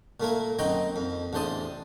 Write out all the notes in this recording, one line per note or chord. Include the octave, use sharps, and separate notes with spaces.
A#2 A3 A#3 E4
F#2 C4 D#4 F#4 D#5 G5
F2
A1 E2 D4 C5 A5 D#6